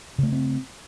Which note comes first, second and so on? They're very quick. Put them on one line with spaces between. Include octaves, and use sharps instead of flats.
C#3 A3 B3 C4